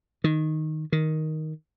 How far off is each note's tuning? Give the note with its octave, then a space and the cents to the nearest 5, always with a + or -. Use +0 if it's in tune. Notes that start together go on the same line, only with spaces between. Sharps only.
D#3 +0
D#3 +5